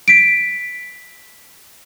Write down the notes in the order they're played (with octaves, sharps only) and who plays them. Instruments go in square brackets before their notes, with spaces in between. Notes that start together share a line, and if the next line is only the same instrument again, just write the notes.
[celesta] B6 D7